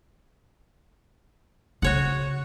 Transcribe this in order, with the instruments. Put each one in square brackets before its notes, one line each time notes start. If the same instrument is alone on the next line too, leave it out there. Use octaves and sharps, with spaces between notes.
[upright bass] C#3 [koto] F#4 C#5 F#5